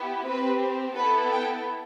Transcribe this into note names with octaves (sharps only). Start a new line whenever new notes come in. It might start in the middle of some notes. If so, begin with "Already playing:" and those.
Already playing: B3 E4 G4
C4 G4 B4
B3 E4 A4 B4
G5